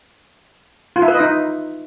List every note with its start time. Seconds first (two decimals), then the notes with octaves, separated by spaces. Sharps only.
0.96 F4
1.02 E4
1.08 B4
1.14 D#5
1.20 D#4